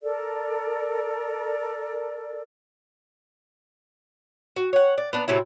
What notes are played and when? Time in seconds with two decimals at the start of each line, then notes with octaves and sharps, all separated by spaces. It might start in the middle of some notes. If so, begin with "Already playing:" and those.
0.03 A4 A#4 D5
4.56 F#4
4.73 C#5 F#5
4.98 D5
5.13 B3 D4 A#5
5.28 A2 C3 F#3 E4